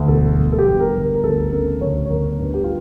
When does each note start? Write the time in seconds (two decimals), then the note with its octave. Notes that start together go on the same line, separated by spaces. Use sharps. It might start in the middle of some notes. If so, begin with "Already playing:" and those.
Already playing: D2
0.08 E1 A4
0.37 G1
0.53 A4
0.58 G4
0.66 G2
0.80 A#4
0.95 G1
1.02 A#4
1.15 A#4
1.23 D2 A4
1.52 C#3 A#4
1.81 D2 C#5
2.05 C#5
2.10 G1 A#4
2.39 G2
2.54 G4
2.64 F4